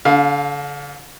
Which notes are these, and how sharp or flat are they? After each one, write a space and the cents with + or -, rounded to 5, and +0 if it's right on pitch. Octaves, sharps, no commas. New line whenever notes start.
D3 -35 F5 +15